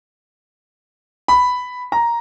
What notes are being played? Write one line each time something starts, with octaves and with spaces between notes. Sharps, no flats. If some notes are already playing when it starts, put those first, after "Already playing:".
B5
A#5